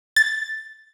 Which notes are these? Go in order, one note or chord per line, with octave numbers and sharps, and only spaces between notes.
A6